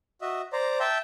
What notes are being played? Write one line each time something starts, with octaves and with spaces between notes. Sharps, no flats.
F#4 D#5 E5
C5 D5 A#5
E5 G5 A5